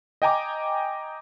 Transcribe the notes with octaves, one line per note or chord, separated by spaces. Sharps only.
D#5 G5 G#5 A#5 D6